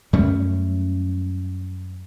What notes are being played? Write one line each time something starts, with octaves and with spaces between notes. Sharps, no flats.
F#2 G3 A3 C#4